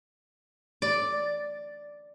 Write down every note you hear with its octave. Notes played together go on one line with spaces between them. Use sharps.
D5